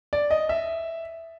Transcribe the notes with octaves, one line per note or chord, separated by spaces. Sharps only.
D5
D#5
E5